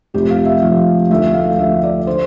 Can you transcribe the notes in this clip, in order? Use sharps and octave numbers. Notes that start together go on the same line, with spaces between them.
F1 F2 C3 F3 G4
F5
E5
F1 F2 C3 F3 F5
D2 D3 F3 A3 E5
F5
D2 D3 F3 A3 E5
D5
D3 C5